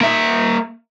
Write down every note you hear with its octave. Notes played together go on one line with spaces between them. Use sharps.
A#3 E5